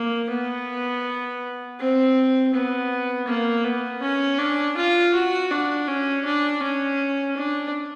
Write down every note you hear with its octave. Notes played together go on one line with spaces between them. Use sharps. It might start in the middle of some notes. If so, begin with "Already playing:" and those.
Already playing: A#3
B3
C4
B3
A#3
B3
C#4
D4
F4
F#4
D4
C#4
D4
C#4
D4